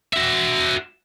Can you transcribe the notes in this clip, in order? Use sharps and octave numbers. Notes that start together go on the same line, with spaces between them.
F#4 E5